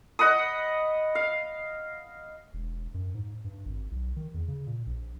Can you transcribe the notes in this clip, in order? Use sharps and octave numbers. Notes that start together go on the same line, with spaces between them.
D#5 F#5 B5 D#6
F5
E1
F#2
G#2
G2
G#1
B1
D#3
E2
C#3
A#2
A#1